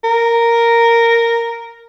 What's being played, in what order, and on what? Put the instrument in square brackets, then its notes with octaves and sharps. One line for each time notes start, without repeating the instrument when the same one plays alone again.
[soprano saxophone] A#4